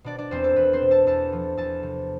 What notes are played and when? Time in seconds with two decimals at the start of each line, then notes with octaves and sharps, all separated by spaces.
0.04 B2 D4 D5
0.18 D4 D5
0.31 E2 C4 C5
0.44 A4
0.56 E2 B4
0.73 C4 C5
0.82 B2
0.91 A4 A5
1.07 E2 A4 A5
1.33 F3
1.57 E2 A4 A5
1.83 C3